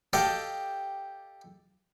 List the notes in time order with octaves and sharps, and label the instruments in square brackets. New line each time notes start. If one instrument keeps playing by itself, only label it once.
[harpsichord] G4 A4 D#5 F5 G5 A5